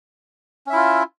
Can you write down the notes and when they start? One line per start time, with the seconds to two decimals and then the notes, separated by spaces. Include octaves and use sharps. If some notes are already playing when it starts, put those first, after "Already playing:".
0.67 C#4
0.70 E5
0.73 E4
0.76 F4